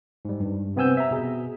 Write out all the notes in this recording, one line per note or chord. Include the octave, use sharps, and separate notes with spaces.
G#2 G3
G2
C3 B3 C4 G#5 E6 G6
E5 A#5
B2 G#4